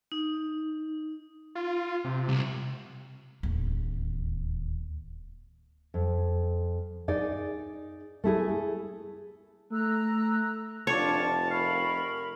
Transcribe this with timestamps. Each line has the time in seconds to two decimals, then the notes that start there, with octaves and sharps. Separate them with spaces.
0.12 D#4
1.55 F4
2.04 C3
2.29 C2
3.43 D1 D#2
5.94 F2
7.08 D#4 G#4 D5
8.24 A3 E4 G#4
9.72 A3 A#5 E6 F#6
10.87 F1 D4 F4 C#5 A5 D6
11.51 A#4 F5 B5 C#6